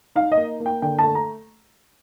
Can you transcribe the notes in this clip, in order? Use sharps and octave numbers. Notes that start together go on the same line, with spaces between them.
D#4 F5
D#5
A#3
A#3
G5
D3 G5
A3 A5
A#5